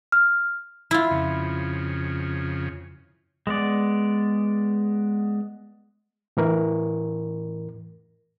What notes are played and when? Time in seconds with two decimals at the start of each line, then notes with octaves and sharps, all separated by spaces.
0.12 F6
0.91 E4 F4
1.11 F2 C#3
3.47 G#3 B3 D5
6.37 A2 E3 A#4